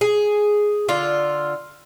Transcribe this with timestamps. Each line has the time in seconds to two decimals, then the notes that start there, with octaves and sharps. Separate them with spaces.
0.01 G#4
0.88 D3 F4